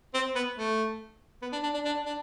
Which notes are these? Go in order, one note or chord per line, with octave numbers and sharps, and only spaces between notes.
C4
B3
A3
B3
D4
D4
D4
D4
D4